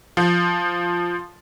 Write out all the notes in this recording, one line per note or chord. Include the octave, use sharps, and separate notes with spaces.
F3